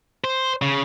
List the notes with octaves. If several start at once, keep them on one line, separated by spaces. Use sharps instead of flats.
C5
C#3